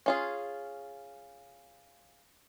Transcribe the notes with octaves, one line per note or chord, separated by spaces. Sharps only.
C#4 F4 G#4